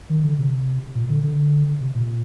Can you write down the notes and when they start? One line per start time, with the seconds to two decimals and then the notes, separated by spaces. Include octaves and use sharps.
0.10 D#3
0.24 D3
0.39 C3
0.95 A#2
1.09 D3
1.23 D3
1.81 C3
1.95 A#2